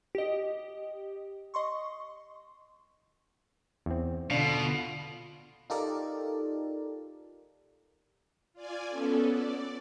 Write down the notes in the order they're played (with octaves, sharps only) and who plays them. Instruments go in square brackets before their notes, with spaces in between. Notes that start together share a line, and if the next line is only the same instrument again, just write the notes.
[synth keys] G4 D#5
D#5 C6 C#6
[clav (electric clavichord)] E2 C4
[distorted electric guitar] B2 [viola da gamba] D3 F4 [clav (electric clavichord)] D4 F5
[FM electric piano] D#4 F4 G4 A4 A#4 D5
[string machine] F4 D5 G#5
B3 C#4 A4
D5